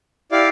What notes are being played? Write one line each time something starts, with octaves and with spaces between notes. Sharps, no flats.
E4 G4 D5 F5